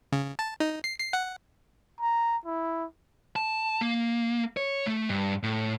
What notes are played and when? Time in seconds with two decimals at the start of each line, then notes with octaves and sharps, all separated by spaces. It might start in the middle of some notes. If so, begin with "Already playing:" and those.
0.12 C#3
0.39 A5
0.60 D#4
0.84 C7
1.00 C7
1.13 F#5
2.01 A#5
2.46 E4
3.36 A5
3.81 A#3
4.57 C#5
4.87 A3
5.09 G2
5.43 A2